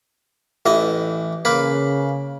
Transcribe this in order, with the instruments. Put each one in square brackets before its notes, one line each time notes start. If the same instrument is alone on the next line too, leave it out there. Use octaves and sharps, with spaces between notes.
[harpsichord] A1 E3 D#5
[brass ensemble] C#3 [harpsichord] A#3 B4